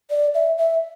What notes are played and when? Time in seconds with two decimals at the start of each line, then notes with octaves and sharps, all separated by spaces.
0.10 D5
0.34 E5
0.58 E5